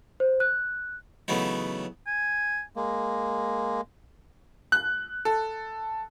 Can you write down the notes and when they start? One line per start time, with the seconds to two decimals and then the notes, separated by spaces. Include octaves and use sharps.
0.20 C5
0.40 F#6
1.28 C#3 E3 F#3 A3 B3 D#4
2.07 G#5
2.76 G#3 A#3
4.72 F#6
5.25 A4